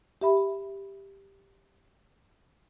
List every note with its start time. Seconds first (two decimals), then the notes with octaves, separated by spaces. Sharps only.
0.21 G4 E5 B5